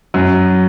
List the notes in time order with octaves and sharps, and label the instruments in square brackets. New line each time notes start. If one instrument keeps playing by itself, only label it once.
[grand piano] F#2 [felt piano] F#3